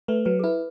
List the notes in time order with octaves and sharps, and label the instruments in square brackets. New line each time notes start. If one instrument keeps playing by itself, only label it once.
[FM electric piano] A3 [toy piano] B4
[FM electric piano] F#3 [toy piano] B4
[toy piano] A4
[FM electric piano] E4 [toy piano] B4